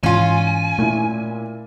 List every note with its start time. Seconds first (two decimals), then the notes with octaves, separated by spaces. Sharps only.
0.03 G#2 E3 C#4 F4 G#5
0.79 A#2 A3 E4